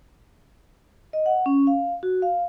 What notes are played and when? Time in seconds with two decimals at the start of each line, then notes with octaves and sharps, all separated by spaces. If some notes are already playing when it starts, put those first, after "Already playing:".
1.13 D#5
1.26 F#5
1.46 C#4
1.67 F5
2.03 F#4
2.22 F5